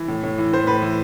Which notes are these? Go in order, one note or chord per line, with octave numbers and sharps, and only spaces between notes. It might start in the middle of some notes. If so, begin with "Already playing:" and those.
Already playing: E3
A2
A2
E3
A2 C5
A2 B4
E3